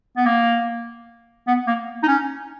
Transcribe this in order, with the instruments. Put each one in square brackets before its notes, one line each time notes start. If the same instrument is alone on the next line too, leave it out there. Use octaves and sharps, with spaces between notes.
[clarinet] B3
A#3
B3
A#3
D#4
C#4